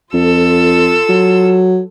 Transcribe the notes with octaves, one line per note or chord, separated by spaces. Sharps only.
F2 F4 A4 E6
F#3